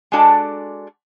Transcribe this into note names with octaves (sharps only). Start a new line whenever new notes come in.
G#3 D4 F#4 A4 D5